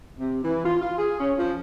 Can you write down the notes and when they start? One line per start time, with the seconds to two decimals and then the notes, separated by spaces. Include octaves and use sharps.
0.18 C3
0.44 E3
0.64 F4
0.81 F4
0.96 G#4
1.18 C#4
1.37 F3